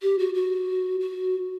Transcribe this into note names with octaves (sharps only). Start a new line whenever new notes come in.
G4
F#4
F#4
F#4